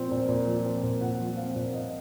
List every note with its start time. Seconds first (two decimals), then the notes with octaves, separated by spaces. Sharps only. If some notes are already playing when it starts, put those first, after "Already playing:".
Already playing: A#2 F3 C4
0.11 A#2
0.28 A#2
0.47 F3
0.65 C4
0.83 A#2
1.01 A#2 F#5
1.20 F3
1.37 C4 F5
1.56 A#2
1.73 A#2 D#5